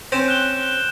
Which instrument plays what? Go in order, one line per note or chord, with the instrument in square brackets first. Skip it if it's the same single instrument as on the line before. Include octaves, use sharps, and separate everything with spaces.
[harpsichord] C4 C#4 [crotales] G6 D7 E7
[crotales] F#6 E7 G7